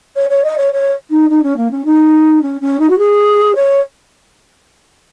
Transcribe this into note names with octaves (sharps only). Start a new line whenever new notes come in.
C#5
C#5
D#5
C#5
C#5
D#4
D#4
C#4
A#3
C#4
D#4
C#4
C#4
D#4
F#4
G#4
C#5